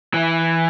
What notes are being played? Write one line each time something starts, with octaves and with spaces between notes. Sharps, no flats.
E3